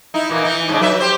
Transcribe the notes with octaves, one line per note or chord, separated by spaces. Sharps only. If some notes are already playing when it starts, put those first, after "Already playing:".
D#4 E4
A#2 E3 A#3
E3 D#4
G#2 C#3 D4
F#3 B4 E5
G4 C5